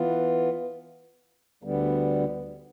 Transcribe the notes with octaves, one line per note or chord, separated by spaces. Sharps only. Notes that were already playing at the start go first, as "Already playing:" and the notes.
Already playing: E3 B3 F4
D2 D3 G3 B3